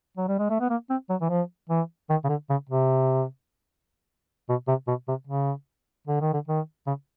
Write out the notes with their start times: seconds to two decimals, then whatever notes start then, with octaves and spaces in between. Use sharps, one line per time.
0.17 F#3
0.28 G3
0.39 G#3
0.50 A3
0.61 B3
0.70 A#3
0.90 C4
1.10 F#3
1.21 E3
1.29 F3
1.69 E3
2.09 D#3
2.24 C#3
2.29 D3
2.50 C#3
2.70 C3
4.49 B2
4.68 C3
4.88 B2
5.08 C3
5.27 C#3
6.07 D3
6.21 D#3
6.34 D3
6.48 D#3
6.87 C#3